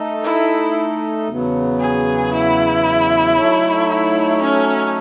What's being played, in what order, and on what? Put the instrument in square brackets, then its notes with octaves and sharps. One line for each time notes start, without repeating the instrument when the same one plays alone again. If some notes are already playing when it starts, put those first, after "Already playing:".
Already playing: [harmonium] A3 D#4 A4 D#5
[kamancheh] E4
[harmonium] E2 C#3 F#3 B3
[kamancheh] G#4
E4
[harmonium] F#3 A3 D#4 A4 C#5
[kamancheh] E4
C#4